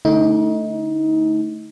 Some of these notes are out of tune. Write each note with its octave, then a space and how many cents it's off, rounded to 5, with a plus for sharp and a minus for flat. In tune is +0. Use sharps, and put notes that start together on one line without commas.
D3 +0 A3 +0 D#4 +30